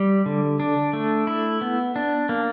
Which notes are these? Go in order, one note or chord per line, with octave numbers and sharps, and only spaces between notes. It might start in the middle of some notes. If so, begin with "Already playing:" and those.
Already playing: G3
D3
D4
A3
E4
B3
D4
A#3